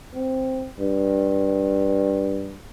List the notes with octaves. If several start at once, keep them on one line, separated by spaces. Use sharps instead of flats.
C4
G2